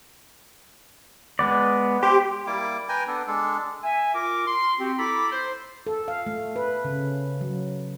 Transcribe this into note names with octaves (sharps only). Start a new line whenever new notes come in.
G#3 B3 D5
G4 C5
G3 A#3 E4 D6
B4 G5 G#5 A#5
B3 D4 A4
G#3 D4 A4
E5 G#5
F4 A#4 D6
C6
C4 F#4 G4
E4 A4 A#5 B5 D6
C5
A4
F5
A3
B4
C#3
F#3